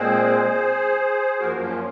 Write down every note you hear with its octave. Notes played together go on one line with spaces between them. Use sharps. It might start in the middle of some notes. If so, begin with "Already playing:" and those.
Already playing: A#2 G#3 C4 G#4 C5
F#2 F3 A#3 F#4 A#4
C#4 F4